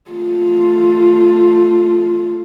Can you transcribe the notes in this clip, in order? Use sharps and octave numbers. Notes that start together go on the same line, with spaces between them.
A3 F4